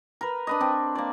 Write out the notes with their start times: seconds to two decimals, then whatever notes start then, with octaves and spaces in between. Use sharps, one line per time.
0.21 A#4 B4
0.47 D4 B4 D#5
0.61 C4 D4
0.95 A#3 D5